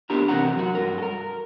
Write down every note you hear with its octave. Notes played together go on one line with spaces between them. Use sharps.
B3 D4 G4 A#4 A#5
C3 E3 C4 A#4 F#5 A#5
F#2 F#4
G2 A#4
A4 A#4